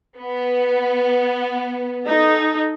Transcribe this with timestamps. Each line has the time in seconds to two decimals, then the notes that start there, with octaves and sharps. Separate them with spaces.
0.18 B3
2.07 D#4 A4